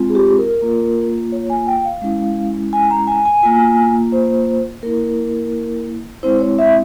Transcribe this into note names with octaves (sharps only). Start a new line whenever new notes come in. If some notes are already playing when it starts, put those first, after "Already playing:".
Already playing: G#3 C4 F4
G#4
G4
A#4
A#3 F4
C#5
G#5
G5
F5
G#3 C#4 E4
G#5
A#5
G#5
G#5
A#3 F4 G#5
C5
A#3 E4 A#4
G#3 C4 E4 C5
C#5
E5